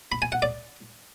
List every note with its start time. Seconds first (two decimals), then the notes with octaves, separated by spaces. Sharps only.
0.12 B5
0.22 G#5
0.32 F#5
0.42 D5